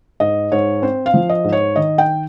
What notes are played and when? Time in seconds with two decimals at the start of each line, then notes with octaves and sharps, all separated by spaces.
0.20 G#2 D#5
0.52 G#2 C#5
0.82 C4 C5
1.06 F5
1.14 F3
1.29 D#5
1.44 G#2
1.52 C#5
1.76 D#3 D#5
1.98 G5